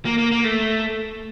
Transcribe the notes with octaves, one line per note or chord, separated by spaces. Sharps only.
A#3
A#3
A#3
A3